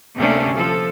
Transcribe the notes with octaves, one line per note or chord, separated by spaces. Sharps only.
D2 C3 A3 A#3 C#4 D4
F3 A4